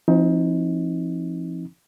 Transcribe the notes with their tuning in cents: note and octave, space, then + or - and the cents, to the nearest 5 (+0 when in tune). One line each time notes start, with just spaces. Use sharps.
F3 -30 C4 +20 D#4 +25